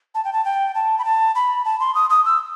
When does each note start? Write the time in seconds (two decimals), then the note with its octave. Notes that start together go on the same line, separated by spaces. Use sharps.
0.15 A5
0.25 G5
0.33 A5
0.45 G5
0.75 A5
0.99 B5
1.05 A5
1.35 B5
1.65 A5
1.80 C6
1.95 D#6
2.10 D#6
2.25 E6